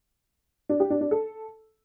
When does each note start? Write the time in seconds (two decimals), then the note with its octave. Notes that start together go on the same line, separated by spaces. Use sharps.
0.69 D4
0.80 G4
0.90 D4
1.01 D4
1.11 A4